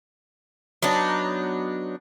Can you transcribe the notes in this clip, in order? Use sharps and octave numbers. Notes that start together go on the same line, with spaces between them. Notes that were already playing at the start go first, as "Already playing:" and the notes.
F#3 B3 D4 D#4